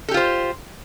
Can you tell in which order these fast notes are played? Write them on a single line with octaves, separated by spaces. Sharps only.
A4 G4 F4 C5